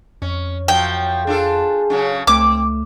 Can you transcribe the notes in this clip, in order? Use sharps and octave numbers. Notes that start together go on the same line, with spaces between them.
F2 C#4
F#2 F3 F#3 G5
D4 F4 G#4 A4
C#3 F#3 C#4
C#2 A3 C4 D6